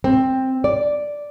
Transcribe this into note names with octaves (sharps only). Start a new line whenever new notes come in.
C4
D5